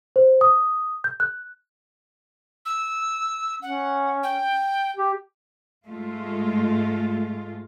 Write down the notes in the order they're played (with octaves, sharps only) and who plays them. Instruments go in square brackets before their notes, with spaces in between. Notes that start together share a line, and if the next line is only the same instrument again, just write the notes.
[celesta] C5
D#6
G6
F#6
[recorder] E6
[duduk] C#4 [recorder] F#5
[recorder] G5
[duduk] G4
[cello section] G#2 G#3 A3 F4